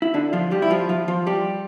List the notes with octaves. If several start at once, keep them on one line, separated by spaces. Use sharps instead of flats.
E4
D3 D4
F3 F4
G3 G4
E4
F3 F4
F3 F4
F3 F4
G3 G4